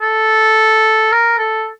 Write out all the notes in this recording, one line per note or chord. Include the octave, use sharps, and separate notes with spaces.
A4
A#4
A4